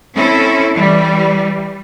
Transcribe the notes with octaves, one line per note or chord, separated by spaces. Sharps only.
C4 C#4 E4 A4
E3 G3